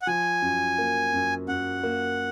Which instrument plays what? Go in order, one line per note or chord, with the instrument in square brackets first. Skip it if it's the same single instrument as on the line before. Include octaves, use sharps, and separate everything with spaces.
[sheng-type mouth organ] F#5
[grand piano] F3 [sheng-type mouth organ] G#5
[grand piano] F#2
A#3
F#2
[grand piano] F#2 [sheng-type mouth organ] F#5
[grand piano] A#3